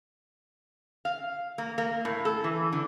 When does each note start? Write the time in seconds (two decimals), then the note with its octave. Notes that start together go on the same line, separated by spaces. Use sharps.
1.05 F5
1.58 A#3
1.78 A#3
2.05 A2
2.25 A4
2.44 E3
2.72 D3